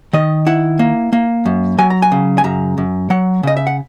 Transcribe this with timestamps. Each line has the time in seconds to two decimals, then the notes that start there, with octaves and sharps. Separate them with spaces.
0.13 D#3 D#5
0.47 E4 F#5
0.79 A#3
1.13 A#3
1.46 F#2
1.78 F#3 G#5
1.90 A#5
2.02 G#5
2.12 C#3
2.38 G#5
2.44 F#2 A#5
2.78 F#2
3.10 F#3 F#5
3.43 C#3 D#5
3.57 E5
3.67 F#5